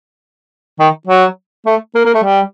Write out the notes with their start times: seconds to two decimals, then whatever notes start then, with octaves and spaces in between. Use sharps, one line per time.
0.79 D#3
1.07 F#3
1.66 A3
1.95 A#3
2.05 A#3
2.15 A3
2.23 G3